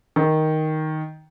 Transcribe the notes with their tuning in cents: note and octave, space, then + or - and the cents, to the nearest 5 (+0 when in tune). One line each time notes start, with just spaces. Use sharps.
D#3 +5